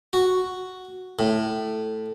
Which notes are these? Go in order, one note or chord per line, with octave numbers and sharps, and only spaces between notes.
F#4
A2